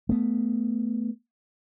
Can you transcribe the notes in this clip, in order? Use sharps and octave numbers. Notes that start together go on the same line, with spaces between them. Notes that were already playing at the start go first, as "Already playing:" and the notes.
A3 B3